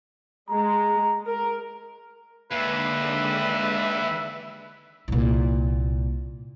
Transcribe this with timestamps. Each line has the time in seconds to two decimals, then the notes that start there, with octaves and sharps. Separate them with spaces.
0.49 G#3 A#5
1.27 A#4
2.52 D#2 D3 G#3 B4 D5 E5
5.08 C2 A#2